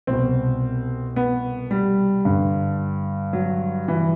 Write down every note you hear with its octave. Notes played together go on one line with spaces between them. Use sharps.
C2 B2 C4
B3
G3
G2 D3
F#3
E3